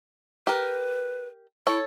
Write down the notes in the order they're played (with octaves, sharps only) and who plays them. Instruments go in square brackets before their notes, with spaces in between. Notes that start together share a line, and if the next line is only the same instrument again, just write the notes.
[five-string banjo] G4 A#4 [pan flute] B4
[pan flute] E4 [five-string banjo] A4 C#5